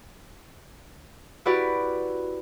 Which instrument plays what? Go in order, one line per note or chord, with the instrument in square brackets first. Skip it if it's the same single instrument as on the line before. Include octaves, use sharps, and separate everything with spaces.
[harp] E4 F#4 G4 B4 D5